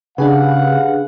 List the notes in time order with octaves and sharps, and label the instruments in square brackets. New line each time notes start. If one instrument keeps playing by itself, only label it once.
[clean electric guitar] C#3 [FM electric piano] D4 G#4 B4 [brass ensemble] G4 F5 F#5